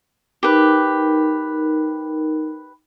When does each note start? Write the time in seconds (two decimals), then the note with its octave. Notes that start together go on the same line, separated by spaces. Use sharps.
0.43 D#4 G4 A#4 B4